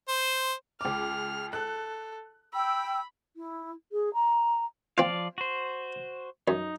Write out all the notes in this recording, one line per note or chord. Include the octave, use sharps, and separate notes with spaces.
C5
C#2 D6 F6
A4 F#6
G5 B5 E6
E4
G#4
A#5
F3 C4 F4 D5 F5
F#4 C5
F#2 D#4